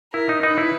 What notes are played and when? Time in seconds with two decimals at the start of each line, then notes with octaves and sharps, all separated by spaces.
0.13 E4 A#4
0.29 D#4
0.43 D#4 B4
0.58 E4